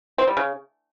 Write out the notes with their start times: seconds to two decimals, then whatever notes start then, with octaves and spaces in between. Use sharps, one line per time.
0.18 C4
0.28 G3
0.37 C#3